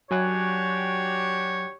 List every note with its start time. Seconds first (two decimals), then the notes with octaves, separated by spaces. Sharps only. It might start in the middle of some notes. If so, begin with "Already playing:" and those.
0.11 F#3 D4 F#4 G4 C#5 G#5 F#6